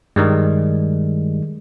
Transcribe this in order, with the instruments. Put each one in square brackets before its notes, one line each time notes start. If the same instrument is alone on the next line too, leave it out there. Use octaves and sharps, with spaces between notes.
[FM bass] G2 [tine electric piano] D#3 G3 G#3